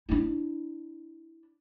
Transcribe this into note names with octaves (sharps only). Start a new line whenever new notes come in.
D4 E4